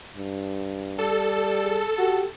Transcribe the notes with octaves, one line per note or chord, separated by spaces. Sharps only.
G2
G3 A4
G#4
F#4 G4